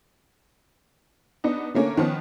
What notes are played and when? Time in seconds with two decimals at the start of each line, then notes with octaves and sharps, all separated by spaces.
1.44 B3 D4 D#4
1.74 D3 A3 A#3 C#4
1.97 D#3 F3 B3 C#4